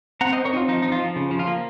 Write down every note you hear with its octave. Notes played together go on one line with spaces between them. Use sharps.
C4 F#5 A#5
C5 D#5
C4
A#4 C#5
C4 D#4 F4
F3 D#4
F3 D#4
F4
F3
C#3
F3
F4
A#3